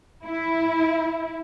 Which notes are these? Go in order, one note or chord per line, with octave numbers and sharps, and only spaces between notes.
E4